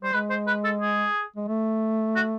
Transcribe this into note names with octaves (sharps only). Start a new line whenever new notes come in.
G3 C5
G#3 B4
C5
B4
A4
G#4
G#3
A3
F#4